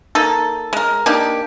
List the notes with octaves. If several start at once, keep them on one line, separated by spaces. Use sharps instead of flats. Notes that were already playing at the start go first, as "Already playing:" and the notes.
A#3 D#4 A4
G#3 A#4
A#3 D4 D#4 G4